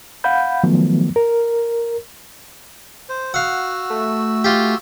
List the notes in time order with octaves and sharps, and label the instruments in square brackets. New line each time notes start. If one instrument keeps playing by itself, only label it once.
[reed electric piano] F5 F#5 B5 G6
D#3 F3 F#3 A3 B3
A#4
[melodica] C5
[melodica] F#4 E6 [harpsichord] F5 F#5
[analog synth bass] A3
[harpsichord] F4 G4